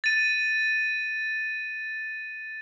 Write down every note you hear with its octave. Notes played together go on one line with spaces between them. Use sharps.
A6 D#7